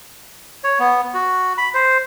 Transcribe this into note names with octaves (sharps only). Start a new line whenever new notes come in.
C#5
B3
F#4
B5
C5